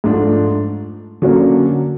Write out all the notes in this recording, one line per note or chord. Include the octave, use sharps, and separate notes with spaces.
G#2 F3 A3 D4
D3 F#3 A#3 C#4